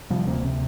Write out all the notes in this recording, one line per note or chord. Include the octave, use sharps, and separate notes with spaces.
C3 F3 G3
D2 A#3 C4
C3